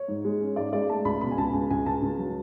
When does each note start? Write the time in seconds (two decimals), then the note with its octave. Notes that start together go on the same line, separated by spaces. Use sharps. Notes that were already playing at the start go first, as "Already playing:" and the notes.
Already playing: C#5
0.08 G#2
0.25 G#3
0.41 C#4
0.56 G#2 D5
0.73 G#3 D5
0.89 A3 A5
1.05 C#2 B5
1.21 B2 B5
1.31 G#5
1.38 C#2 A5
1.53 C#2 G#5
1.70 C#2 G#5
1.86 C#2 A5
2.02 C#2
2.18 F#3